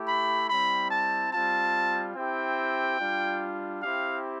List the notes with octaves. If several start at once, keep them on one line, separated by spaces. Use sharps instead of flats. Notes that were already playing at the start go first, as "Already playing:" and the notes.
Already playing: A3 E4 G4
B5
G3 C4 E4 B5
A5
G3 C4 F4 A5
C4 E4 G4 G5
G3 D4 F4
C4 E4 G4 F5